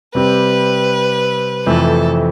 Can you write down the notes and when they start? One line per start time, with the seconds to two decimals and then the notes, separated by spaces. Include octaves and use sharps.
0.15 C3 G3 C4 G4 B4
1.66 F2 C3 E3 A3 C4 A4